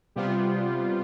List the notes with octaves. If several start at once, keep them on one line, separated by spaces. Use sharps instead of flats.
C3 G3 B3 F4